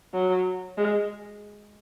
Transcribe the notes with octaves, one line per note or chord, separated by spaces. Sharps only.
F#3
G#3